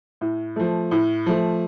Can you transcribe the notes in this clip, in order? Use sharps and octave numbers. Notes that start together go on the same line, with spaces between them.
A2
F3 A3
A2
F3 A3